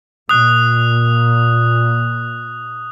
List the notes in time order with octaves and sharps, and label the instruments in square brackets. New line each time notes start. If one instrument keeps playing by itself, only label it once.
[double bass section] A#2 [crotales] D#6 F#6